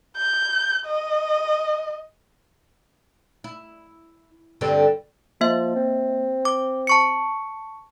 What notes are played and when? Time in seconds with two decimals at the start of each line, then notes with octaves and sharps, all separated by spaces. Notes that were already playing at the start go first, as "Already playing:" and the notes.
0.17 G6
0.86 D#5
3.44 E4
4.61 G2 D3 C4
5.41 F3 A#3 E5
5.75 C4
6.45 D6
6.87 A5 C#6 C#7